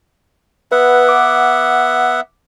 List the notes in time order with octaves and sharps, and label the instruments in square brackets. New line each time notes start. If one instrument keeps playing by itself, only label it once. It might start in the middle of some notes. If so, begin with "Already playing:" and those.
[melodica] B3 E5 F#5 [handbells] B4
[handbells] D6